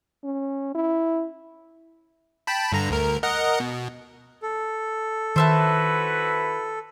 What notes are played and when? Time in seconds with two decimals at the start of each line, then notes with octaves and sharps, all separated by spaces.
0.24 C#4
0.75 E4
2.47 G5 A5 B5
2.72 G2 D3 A#5
2.91 D2 A#4
3.23 A#4 D#5 F#5
3.60 B2
4.43 A4
5.36 D#3 E4 F#4 B4 C5 E5 A5